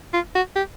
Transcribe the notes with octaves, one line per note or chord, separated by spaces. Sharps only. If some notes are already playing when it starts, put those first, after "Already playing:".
F4
F#4
G4